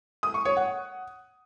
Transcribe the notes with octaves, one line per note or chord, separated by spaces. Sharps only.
D#6
C#6
C#5
F#5